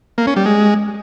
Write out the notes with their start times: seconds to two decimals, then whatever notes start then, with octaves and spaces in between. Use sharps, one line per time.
0.18 A#3
0.27 C#4
0.36 G3
0.46 G#3